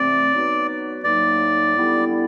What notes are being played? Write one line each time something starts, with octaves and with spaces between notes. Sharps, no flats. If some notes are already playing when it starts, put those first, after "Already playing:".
Already playing: C3 E3 A3 C4 D5
F#3 B3 D#4 F#4 B4
A2 F#3 A#3 D#4 D5
D3 G3 B3 E4